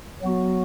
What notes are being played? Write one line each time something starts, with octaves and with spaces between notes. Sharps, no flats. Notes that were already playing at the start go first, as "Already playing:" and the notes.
F#3 B3 F#4